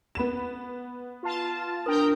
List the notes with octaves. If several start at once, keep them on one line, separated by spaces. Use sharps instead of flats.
B3 B5 E7
F4 A5
D4 A#4 G5 D#6